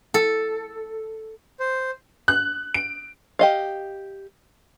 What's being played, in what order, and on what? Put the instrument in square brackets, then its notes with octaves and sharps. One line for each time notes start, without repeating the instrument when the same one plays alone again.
[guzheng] A4
[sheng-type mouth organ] C5
[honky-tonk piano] F#6
D7
[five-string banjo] G4 D#5 F5